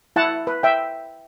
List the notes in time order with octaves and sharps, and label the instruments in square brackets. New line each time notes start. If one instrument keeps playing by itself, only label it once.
[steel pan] E4 F#5 A5
B4
E5 G5